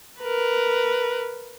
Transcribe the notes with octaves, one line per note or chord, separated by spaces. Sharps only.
A#4 B4